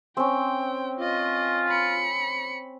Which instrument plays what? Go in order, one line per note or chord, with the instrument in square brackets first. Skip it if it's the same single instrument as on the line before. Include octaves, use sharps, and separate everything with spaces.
[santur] C4 C#4 [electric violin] G5
[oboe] F4 [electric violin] D#5
[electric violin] B5 C#7